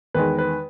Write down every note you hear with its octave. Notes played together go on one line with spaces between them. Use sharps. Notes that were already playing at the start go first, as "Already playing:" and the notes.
E2 D#3 G#3 B4
B4